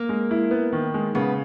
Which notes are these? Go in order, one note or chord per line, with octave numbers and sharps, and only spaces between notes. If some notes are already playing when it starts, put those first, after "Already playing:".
Already playing: A#3
G#3
E4
B3
D#3
G#3
C#3 B3